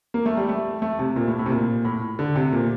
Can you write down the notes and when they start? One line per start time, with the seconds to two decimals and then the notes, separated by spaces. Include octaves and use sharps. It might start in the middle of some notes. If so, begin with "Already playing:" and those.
0.14 A#3
0.26 A3
0.37 G3
0.49 A3
0.82 A3
0.99 C3
1.16 A#2
1.27 A2
1.39 A2
1.46 C3
1.50 A#2
1.85 A2
2.19 D3
2.36 C3
2.53 A#2